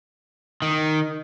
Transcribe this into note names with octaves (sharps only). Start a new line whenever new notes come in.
D#3